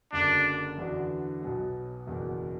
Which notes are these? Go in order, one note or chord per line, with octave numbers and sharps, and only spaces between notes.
F#1 F#2 D3 D4
E2 D3 B3 D4 F#4
B1 B2 F#3 B3
F#1 E2 B2